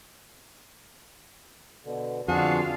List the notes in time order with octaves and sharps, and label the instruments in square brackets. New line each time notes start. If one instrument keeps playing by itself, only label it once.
[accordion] B2 D3
[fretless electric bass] F2 [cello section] D3 F4 F5 [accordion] B3 D4 G#4 [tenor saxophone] F#4